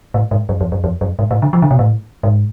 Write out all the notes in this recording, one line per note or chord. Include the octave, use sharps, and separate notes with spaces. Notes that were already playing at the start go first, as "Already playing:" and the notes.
A2
G#2
F#2
F2
F#2
F2
F#2
G#2
A2
D3
F3
D3
B2
A2
G#2